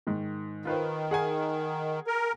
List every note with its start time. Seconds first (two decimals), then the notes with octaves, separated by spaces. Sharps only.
0.07 G#2 D#3
0.65 D#3 F4 B4 C5
1.11 G#4 F#5 G#5
2.07 A#4